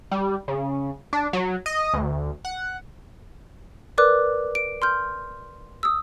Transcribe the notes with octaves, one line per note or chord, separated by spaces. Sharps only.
G3
C#3
D4
F#3
D#5
D2
F#5
A#4 B4 D5 D6 F#6
D7
C6 F6 G6
D#6 E6